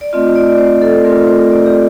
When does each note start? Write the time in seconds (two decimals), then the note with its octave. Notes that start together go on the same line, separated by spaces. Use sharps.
0.01 D5
0.13 A3 C4 F4 D#5
0.35 D5
0.58 C5
0.82 A4
1.05 A3 C4 F4 A#4
1.24 A#4
1.28 C5
1.52 D5
1.66 G4